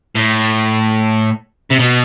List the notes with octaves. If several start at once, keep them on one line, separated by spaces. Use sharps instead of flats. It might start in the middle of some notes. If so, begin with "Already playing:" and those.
A2
C3
B2